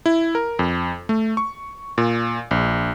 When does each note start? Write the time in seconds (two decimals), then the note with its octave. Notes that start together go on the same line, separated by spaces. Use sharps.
0.06 E4
0.35 A#4
0.59 F2
1.09 A3
1.37 C#6
1.98 A#2
2.51 A#1